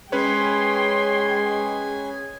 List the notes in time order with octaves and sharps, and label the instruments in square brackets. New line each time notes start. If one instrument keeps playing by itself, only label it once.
[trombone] G#3 [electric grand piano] C#4 B4 C#5 [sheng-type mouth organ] G#4 G#5 [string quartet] G5 C6